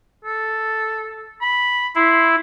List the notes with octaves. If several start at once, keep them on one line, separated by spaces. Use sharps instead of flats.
A4
B5
E4 C6